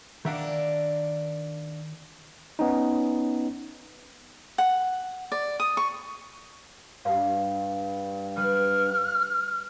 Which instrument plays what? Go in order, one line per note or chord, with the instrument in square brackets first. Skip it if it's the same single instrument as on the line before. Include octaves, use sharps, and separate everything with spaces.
[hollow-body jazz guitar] D#3 E5 F#5 [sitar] A#3 D4
[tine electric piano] B3 C#4 D#4
[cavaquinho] F#5
D5
D#6
C#6
[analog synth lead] G2 [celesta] F5
[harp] G3 B4 [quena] F6